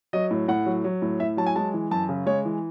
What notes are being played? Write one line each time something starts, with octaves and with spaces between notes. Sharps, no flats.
F#3 D#5
A2
A2 F#5
F#3
F#3
A2
A2 E5
F#3 A5
G#5
G#3 A5
E3
F#2 A5
C#3
G#3 C#5
E3